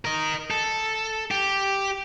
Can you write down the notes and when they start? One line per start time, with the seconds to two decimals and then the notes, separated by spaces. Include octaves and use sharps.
0.05 A#4 D#5
0.51 A4
1.31 G4